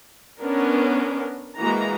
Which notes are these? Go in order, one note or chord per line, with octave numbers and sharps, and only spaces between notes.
B3 C#4 D4 A#4
E3 G#3 A#3 F#4 A#5